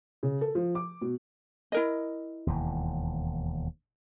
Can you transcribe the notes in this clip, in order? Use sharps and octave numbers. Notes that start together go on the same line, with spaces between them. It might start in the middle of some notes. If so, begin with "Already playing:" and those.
C#3
A4
F3
D6
B2
E4 A#4 D#5
E1 D#2